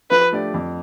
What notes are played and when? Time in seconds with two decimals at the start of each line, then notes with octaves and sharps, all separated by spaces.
0.11 F3 B4
0.32 A3 D4 G4 D5
0.54 F2